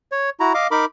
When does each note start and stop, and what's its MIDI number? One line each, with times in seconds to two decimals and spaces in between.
0.12 0.30 73
0.40 0.53 64
0.40 0.53 66
0.40 0.53 82
0.54 0.67 75
0.54 0.67 77
0.54 0.67 86
0.71 0.85 63
0.71 0.85 70
0.71 0.85 83
0.71 0.85 86